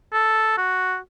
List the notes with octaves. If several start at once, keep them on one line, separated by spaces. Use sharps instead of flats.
A4
F#4